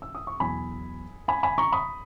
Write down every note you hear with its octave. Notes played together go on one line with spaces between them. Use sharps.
E6
D#6
C#6
E2 B2 F#3 G#5 B5
G#5 B5
G#5 B5
A#5 C#6
B5 D#6